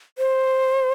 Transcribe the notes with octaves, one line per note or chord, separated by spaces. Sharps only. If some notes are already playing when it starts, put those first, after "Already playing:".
C5